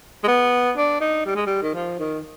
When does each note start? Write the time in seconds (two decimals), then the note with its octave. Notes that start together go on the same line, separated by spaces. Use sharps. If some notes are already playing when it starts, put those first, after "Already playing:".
0.24 G#3
0.28 B3
0.77 D4
1.01 D#4
1.26 G3
1.35 G#3
1.46 G3
1.63 D#3
1.74 F3
1.99 D#3